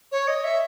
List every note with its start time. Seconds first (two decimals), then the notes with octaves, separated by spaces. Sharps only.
0.12 C#5
0.28 D#5
0.44 E5